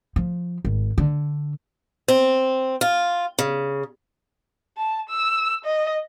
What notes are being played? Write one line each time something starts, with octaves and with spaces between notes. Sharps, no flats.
F3
G#1
D3
C4
F4
C#3
A5
E6
D#5